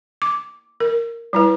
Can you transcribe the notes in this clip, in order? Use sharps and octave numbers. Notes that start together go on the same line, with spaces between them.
D6
A#4
G3 E4 B4